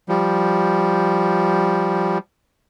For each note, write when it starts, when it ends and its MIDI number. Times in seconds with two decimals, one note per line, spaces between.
0.09 2.18 53
0.09 2.18 55